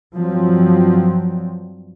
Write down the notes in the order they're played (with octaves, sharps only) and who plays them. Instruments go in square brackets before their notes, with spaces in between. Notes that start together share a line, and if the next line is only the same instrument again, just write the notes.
[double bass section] G2 F3 F#3 C4